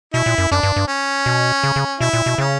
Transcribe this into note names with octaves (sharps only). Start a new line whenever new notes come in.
B2 E4
A#2
F#2
F#2 D4
G2
G2
C#4
B2
C#3
C#3
B2 E4
A#2
B2
C#3 C#4